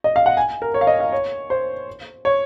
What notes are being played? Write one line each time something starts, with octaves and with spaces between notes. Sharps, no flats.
D#5
F5
F#5
G#5
A#4
C#5
F5
D#5
F5
C#5
C5
C#5